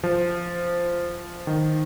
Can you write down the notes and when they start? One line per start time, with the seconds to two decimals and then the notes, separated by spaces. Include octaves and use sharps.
0.04 F3
1.47 D#3